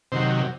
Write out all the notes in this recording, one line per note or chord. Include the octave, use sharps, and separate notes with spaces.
C3 D#3 F#3 C5